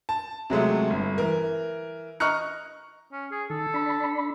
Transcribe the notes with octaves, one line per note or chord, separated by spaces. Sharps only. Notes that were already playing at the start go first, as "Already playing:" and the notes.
A5
C3 F#3 G#3 A3
G1
E3 A#4
D#5 A#5 C#6 F6 F#6 C#7
C#4
G#4
D#3 A4
D4 B5